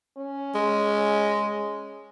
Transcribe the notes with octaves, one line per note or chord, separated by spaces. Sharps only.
C#4
G#3